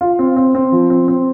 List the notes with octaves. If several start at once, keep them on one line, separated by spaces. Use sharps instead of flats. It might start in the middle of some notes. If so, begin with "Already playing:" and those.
F4
C4
C4
C4
F3
C4
C4